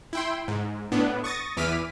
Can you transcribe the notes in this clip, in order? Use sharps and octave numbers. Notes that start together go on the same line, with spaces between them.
E4 G5 C6
G#2
A2 B3 D4
C#6 D#6 A6 A#6
E2 E3 D6 F6 B6 D#7